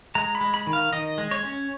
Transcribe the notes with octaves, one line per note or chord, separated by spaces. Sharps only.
G#3 A#5
B5
G#3
B5
D#3
F5
D#3 D#5
G#3
C#5
C#4